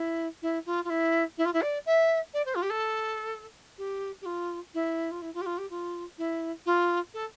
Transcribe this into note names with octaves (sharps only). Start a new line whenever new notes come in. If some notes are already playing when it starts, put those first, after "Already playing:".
Already playing: E4
E4
F4
F4
E4
E4
F4
E4
D5
E5
D5
C5
F4
G4
A4
G4
G4
F4
E4
F4
E4
F4
G4
F4
G4
F4
E4
F4
A4